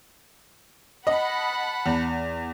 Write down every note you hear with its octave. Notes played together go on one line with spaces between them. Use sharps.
D#5 F#5 A5 B5
E2